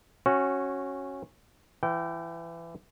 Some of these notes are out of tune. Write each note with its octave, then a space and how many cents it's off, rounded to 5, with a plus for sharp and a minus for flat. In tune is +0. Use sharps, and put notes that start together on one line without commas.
C#4 -15 F#4 +0
E3 +25 G5 -25